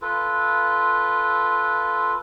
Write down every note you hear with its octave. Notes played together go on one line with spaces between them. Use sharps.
F4 A4 B4